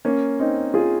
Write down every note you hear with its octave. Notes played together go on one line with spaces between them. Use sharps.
A#3 C#4
C4 D#4
F4 G#4